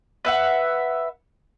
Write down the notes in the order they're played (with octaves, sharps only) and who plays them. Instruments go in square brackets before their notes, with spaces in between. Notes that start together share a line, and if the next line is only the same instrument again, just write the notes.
[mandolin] B4 E5 F#5